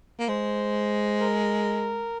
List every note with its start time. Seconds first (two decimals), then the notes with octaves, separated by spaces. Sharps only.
0.19 A#3
0.29 G#3 C5
1.20 A#4